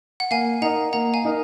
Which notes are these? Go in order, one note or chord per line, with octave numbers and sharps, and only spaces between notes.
F#5
A#3 F5 G#5
D#4 A#4 D#5 F#5 A#5
A#3 F#5 A#5
F5 G#5
D#4 A#4 D#5